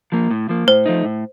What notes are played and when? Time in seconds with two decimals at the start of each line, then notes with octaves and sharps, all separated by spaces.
0.12 F3 A#3
0.31 A2
0.49 F3 A#3
0.67 A2 C5
0.86 F3 A3 D#4
1.05 A2